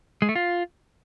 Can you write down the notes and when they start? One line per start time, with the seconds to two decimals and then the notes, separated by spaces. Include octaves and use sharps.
0.22 G#3
0.29 A3
0.35 F4